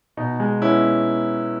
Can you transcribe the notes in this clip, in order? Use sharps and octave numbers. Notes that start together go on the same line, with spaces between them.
B2 D#4
G#3
B3 C#4 E4